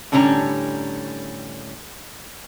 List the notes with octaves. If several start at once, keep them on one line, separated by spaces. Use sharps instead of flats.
A2 D3 G3 C#4 D4 A#5